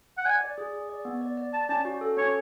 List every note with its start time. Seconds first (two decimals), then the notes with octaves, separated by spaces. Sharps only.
0.18 F#5
0.25 D5 G#5
0.41 D5
0.58 G#4
0.73 G#4
0.89 D5
1.05 B3
1.21 D5
1.37 D5
1.53 D5 A5
1.69 C#4 A5
1.85 F#4
2.01 A4
2.17 C#4 C#5